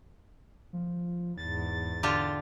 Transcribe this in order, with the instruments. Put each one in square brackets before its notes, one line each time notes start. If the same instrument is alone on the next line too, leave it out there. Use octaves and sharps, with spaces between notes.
[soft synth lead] F3
[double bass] E2 G#2 [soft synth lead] A6
[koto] D3 F4 G4